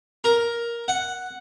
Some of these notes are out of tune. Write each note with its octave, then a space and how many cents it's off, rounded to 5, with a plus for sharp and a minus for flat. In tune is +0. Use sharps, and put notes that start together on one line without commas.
A#4 +10
F#5 +0